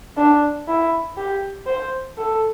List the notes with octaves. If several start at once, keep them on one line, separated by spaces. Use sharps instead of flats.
D4
E4
G4
C5
A4